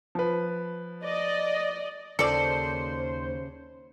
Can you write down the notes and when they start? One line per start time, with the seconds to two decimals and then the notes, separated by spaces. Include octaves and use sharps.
0.15 F3 B4
1.04 D5 D#5
2.19 D#2 C#3 A4 C5 D5 C#7